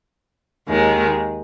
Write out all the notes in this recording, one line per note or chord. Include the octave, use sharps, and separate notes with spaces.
D#2 D#3 G#3